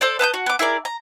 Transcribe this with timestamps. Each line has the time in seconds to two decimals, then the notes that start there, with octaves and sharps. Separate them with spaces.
0.01 A4 C5 D5
0.19 B4 A5 D#6 G6
0.34 F#4
0.46 B3 D6
0.59 E4 G#4 A#4 D5
0.85 A#5